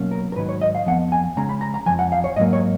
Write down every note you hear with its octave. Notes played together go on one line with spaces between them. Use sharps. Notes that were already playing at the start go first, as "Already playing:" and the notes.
Already playing: B2 F#3 A#3 C#4
A#4
A#4
G#2 D#3 F#3 B4
C#5
D#5
F5
F2 F3 B3 F#5
G#5
C#3 G#3 C#4 A#5
B5
A#5
A#5
F2 C#3 F3 G#5
F#5
F5
C#5
G#2 F#3 A#3 D#5
C#5